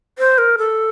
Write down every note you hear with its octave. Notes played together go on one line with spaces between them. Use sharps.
C5
A#4
A4